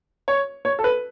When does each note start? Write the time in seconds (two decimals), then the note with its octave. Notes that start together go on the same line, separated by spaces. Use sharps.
0.28 C#5
0.65 C#5
0.79 A4
0.84 B4